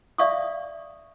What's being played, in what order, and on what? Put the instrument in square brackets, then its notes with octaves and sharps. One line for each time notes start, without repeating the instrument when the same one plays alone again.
[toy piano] D5 E5 F5 C#6 D#6